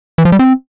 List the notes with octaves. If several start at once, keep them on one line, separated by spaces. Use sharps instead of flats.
E3
F3
G3
C4